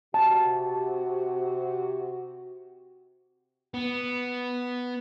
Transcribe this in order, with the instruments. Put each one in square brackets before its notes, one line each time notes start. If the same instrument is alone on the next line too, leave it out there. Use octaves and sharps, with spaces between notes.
[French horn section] C3 F#4 [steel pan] A5
[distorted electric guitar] B3